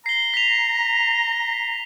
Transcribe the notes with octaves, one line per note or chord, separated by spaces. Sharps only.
A#5 C7 G7
B6 F7